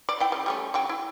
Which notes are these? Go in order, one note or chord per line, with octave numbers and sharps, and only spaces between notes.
D5
E4 G5
C#3
G3 A3 C#4
C#3 F#3 G5
E4